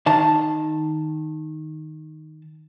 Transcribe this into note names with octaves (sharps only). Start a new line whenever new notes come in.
D#3 A5